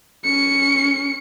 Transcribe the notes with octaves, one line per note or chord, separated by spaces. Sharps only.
C#4 C#7